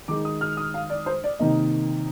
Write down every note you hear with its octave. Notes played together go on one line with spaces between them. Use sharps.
D#3 G#3 D#4 D6
D#6
F6
D#6
F5
D5
C5
D5
C3 D#3 A#3 D#4 D#5